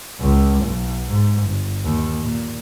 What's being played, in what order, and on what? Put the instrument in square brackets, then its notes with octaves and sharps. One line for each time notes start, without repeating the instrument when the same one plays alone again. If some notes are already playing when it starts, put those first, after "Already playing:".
[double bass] C#2
B1
G#2
G1
D#2
A#2